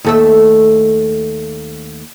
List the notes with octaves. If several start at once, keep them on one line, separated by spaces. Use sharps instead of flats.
D#2 A3 E5